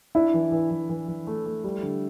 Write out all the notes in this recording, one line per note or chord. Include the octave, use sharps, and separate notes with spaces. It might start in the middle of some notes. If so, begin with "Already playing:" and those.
D4 E4
E3
E3
E3
E3
E3
A3
A3
G3
D3